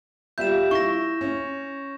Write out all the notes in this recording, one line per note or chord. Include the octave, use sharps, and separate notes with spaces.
G3 F4 E5 G6 E7
E4 C#6 A#6
C#4